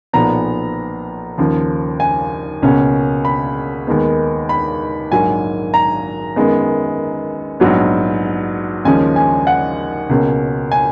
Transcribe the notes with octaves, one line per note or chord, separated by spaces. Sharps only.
B1 A#2 F3 B3 A#5
D#2 C#3 F3
G#5
C#2 B2 A#3 C#4
B5
D#2 D#3 G#3 B3
B5
A#1 G#2 F#3 A#3 G#5
A#5
F#2 D#3 G#3 B3
A#1 G#2 F#3 B3
D#2 C#3 F3 G#3 C#4 G#5
G#5
F#5
C#2 B2 A#3 C#4
G#5